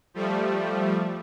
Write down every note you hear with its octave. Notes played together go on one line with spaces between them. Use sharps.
F3 G3 A3